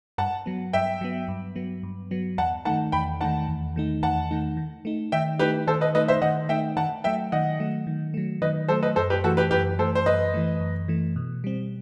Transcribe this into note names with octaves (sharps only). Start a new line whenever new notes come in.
G2 F#5 A5
F#3 B3
G2 E5 G5
F#3 B3
G2
F#3 B3
G2
F#3 B3
E2 F#5 A5
D#3 A3 D#4 F#5 A5
E2 G5 B5
D#3 A3 D#4 F#5 A5
E2
D#3 A3 D#4
E2 F#5 A5
D#3 A3 D#4
D#3
A3 D#4
D#3 E5 G5
A3 D#4 G4 B4
D#3 A4 C5
B4 D#5
A3 D#4 B4 D#5
C5 E5
D#3 D#5 F#5
A3 D#4 E5 G5
D#3 F#5 A5
F#3 A3 E5 G5
D#3 D#5 F#5
F#3 A3
D#3
F#3 A3
D#3 B4 D#5
F#3 A3 A4 C5
B4 D#5
F#2 A4 C5
G4 B4
E3 A3 F#4 A4
G4 B4
F#2 G4 B4
E3 A3 A4 C5
C5
F#2 B4 D#5
E3 A3
F#2
E3 A3
B2
G3 C4